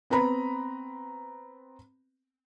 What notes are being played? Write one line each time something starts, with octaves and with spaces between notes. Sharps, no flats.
B3 C4 B4 A#5 B5